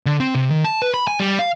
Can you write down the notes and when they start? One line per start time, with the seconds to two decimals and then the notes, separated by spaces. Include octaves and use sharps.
0.06 D3
0.20 C4
0.35 C3
0.50 D#3
0.64 A5
0.82 B4
0.94 B5
1.08 G#5
1.20 G3
1.39 F5